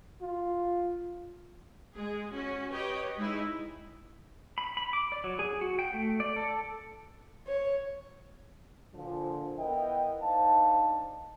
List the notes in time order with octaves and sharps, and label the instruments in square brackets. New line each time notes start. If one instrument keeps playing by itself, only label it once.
[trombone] F4
[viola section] G#3 G#4
C#4 F#4
G4 B4 C#5 D#5 G5
G#3 D#4 E4
[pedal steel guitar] B5
B5
D6
D5
F#3
G#4
F#4
G5
A3
D5
A4
[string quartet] C#5
[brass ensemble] A#2 D3 F3
B3 E4 A#4 D#5 G5
D4 D#4 C5 F5 A5